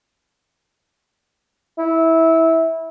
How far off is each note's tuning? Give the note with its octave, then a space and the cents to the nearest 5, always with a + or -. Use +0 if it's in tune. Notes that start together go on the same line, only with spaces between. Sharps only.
E4 -15